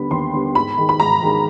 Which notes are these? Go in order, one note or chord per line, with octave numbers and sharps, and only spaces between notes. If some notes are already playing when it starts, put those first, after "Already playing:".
Already playing: D#2 D3 G3 B3 B5
D#2 C6
D3 G3 B3
G#2 B5
D#3 G#3
B5
G#2 A#5
D#3 G#3